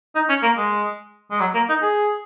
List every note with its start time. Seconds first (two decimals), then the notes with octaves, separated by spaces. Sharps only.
0.15 D#4
0.29 C#4
0.43 A#3
0.57 G#3
1.31 G#3
1.40 F#3
1.54 A#3
1.69 D#4
1.82 G#4